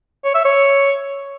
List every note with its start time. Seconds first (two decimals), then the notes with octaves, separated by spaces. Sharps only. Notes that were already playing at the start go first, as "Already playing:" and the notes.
0.24 C#5
0.34 E5
0.45 C#5